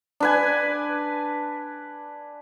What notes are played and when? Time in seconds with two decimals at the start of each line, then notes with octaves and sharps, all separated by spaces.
0.20 D4 B4 G#5